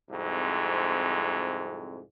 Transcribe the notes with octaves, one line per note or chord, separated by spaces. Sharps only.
C2 F2 G#2